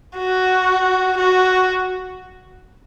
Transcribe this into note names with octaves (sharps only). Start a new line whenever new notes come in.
F#4
F#4